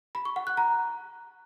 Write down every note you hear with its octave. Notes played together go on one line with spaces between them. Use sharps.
B5
C#6
F#5
F#6
A#5